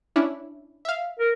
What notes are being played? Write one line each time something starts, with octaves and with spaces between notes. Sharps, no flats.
C#4 D4 E4
E5 F5
A#4